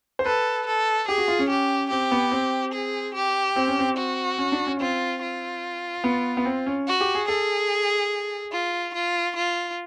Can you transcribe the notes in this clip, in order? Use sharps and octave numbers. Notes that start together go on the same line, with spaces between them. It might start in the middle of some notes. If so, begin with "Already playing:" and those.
C5
A4 B4
A4
G4 G#4
F#4
F4
C#4
G4
C4 G4
B3
C4
G#4
G4
C4
C#4
C4
F#4
C#4
D4
C#4
C4 F4
F4
B3
B3
C4
C#4
F#4
G4
G#4
G#4 A4
F4
F4
F4